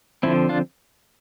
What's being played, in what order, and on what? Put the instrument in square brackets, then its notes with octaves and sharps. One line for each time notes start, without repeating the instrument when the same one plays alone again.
[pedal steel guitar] D3 F3 C4 E4
D4 F4